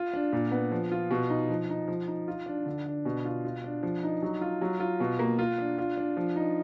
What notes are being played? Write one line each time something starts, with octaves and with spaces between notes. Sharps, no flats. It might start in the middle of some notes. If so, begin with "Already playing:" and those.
Already playing: F4
D4
A#2
B3
F3
F4
B2
D#4
F3
D#4
F3
D#4
F4
D4
D3
D4
B2
F4
F4
D4
F3
D#4
F#3
F4
F#3
F4
B2
A#3
F4
D4
F4
D4
F3
D#4